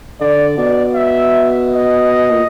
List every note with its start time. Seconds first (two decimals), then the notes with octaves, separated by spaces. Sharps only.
0.20 D3 D5
0.58 B2 D5
0.94 E5
1.68 D#5
2.31 A#2